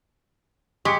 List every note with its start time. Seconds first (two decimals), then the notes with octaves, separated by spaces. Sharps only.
0.85 G#3 G4 C#6 D6 C#7